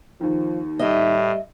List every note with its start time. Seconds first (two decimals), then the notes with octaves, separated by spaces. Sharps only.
0.21 D#2 D#3 F3
0.79 A2 G3 D#5 E5